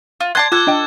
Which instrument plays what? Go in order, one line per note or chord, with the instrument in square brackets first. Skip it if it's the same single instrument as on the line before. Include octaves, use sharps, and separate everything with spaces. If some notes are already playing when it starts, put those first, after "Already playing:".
[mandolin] F4
[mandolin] D5 A5 C6 [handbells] F#6 [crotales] G#6
[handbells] F4 [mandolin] A4 [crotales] D6 F#6 G#6
[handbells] D4 D#5 G5